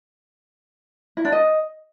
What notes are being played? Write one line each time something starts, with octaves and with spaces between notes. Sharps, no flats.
E4
D4
D#5